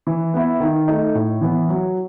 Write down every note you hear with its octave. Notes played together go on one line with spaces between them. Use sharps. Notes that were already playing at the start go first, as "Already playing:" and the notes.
E3
B3 E4
D#3
A3 D#4
A2
E3 B3
F#3